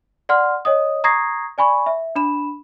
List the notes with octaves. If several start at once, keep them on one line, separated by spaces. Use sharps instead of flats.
D5 F#5 C6 F6
C#5 D#5 D#6
A#5 C#6 D#6 G#6 A#6 C7
D5 G#5 B5 C#6
E5
D4 B5 E7